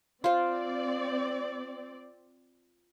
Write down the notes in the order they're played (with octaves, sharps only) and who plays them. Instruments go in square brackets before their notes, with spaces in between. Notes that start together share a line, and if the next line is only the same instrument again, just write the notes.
[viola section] C4 D5 [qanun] F4 C5